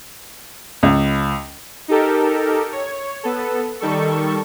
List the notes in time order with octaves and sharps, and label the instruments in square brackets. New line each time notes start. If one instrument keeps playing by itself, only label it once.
[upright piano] C#2
[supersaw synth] D#4 G4 A4 A#4
C#5
B3 A4
D#3 G3 A4 C#6